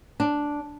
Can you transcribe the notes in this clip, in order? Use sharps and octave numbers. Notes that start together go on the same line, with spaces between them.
D4